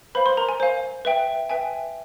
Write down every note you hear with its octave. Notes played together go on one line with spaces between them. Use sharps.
B4 C5 F5 B5
C5 C6
A#4 A#5
G#5
C5 F5
B4 E5 G5
B4 E5 G5 G#5